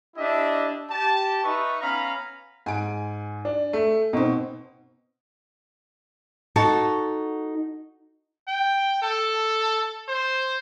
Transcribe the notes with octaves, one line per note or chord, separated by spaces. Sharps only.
D4 E4 G4 D#5 E5
G4 A5
D#4 B4 E5 C#6
B3 C#4 F5 A#5 B5
G#2 G#5 D7
D4
A3
B2 C4 D#4
D#4 F#4 A4 A5
G5
A4
C5